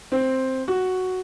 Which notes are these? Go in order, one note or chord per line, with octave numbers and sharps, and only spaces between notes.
C4
F#4